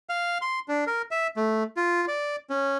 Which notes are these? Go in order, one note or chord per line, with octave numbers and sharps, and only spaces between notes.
F5
C6
D4
A#4
E5
A3
F4
D5
C#4